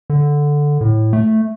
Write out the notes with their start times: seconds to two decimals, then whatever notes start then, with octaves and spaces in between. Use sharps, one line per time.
0.10 D3
0.81 A2
1.13 A3